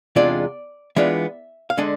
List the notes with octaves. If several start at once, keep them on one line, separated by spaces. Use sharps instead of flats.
E2 C3 G#3 D4 F4 D5
E3 G#3 B3 D4 F4 E5
F5
D3 G#3 D4 G#5